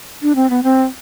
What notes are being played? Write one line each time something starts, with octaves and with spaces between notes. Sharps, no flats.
D4
C4
B3
C4